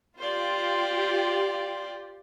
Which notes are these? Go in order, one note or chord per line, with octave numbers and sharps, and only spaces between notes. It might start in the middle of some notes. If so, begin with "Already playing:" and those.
F4 G4 C5 D5